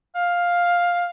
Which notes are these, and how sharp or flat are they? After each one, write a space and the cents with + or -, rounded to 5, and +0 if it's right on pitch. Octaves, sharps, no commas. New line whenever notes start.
F5 +5